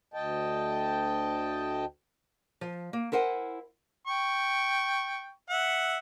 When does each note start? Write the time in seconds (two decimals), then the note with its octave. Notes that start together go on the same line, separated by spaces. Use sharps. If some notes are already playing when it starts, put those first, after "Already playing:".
0.14 D2 D#5 G5 A5
2.61 F3
2.93 A#3
3.12 E4 A#4 C5 F#5 G#5
4.07 G5 C#6
5.50 E5 F#5